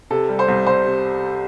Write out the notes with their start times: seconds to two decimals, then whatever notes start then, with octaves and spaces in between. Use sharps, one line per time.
0.10 C3 A4
0.29 G3
0.39 C5
0.48 C2
0.67 C2 C5
0.85 C3